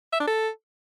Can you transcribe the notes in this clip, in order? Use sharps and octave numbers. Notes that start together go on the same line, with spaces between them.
E5
D4
A4